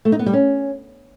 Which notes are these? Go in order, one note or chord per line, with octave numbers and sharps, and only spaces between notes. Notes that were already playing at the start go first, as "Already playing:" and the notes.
A3
D#4
B3
G3
C#4